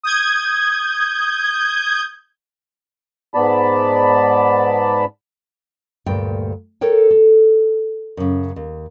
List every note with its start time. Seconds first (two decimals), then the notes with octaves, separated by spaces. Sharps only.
0.03 D#6 G6 G#6
3.34 G#2 B3 D5 A5 B5
6.06 D2 G2 A#2 G5
6.81 A4 A#4 C#5 G5
7.11 A4
8.17 F#2 C#3
8.56 D#2